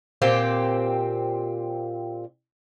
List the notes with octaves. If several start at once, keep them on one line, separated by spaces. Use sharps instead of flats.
A#2 C4 G4